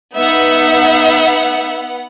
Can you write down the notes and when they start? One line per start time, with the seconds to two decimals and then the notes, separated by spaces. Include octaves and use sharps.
0.15 B3 D#4 E5 F#5